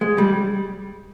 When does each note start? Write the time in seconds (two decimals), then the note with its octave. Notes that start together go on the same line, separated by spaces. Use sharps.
0.01 G#3
0.18 G3